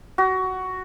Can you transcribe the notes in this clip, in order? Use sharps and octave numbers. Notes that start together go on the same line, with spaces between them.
F#4